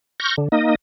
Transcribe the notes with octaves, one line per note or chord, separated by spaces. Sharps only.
C#6 F6 G6 A#6
D3
A#3 D#4 D#5